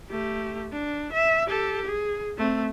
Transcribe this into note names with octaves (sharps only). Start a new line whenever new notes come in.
A3 G4
D4
E5
G4 A4
G#4
A3 C4